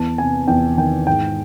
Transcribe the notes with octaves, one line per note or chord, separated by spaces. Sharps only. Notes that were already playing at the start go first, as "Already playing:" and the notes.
Already playing: E2 A5
C3 G#5
E2 G5
D#3 G5
G#2 G5